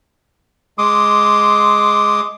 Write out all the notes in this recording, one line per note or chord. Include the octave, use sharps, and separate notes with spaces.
G#3 C6 D6 D#6